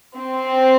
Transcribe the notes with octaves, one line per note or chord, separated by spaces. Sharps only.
C4